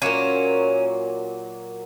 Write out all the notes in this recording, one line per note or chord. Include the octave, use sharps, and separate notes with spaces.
A#2 F#3 A#3 C#4